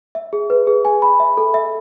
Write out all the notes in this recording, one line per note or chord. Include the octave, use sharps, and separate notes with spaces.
E5
G#4
B4
G#4
G#5
B5
E5
A4
E5